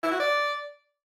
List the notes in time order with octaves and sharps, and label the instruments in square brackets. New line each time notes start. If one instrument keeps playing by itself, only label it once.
[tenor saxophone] E4
F#4
D5